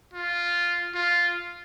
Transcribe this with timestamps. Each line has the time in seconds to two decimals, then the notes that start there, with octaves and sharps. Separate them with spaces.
0.14 F4
0.95 F4